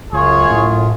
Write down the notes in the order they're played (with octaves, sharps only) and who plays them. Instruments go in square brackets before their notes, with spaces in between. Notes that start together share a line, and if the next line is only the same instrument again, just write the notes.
[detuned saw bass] C#2 [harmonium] F#2 F4 [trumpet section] G#4 C#5
[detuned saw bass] A2